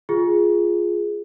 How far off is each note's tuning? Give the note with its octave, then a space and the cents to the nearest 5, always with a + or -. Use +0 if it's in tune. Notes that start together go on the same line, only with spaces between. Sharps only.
F4 +0 G#4 +0